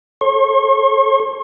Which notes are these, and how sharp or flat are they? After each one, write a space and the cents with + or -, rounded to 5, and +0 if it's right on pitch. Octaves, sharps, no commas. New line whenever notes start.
A4 +0 C#5 -40 C#6 -45